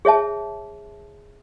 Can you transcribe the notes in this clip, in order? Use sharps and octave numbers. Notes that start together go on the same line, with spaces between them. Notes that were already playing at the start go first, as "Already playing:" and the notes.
G#4 C#5 E5 A5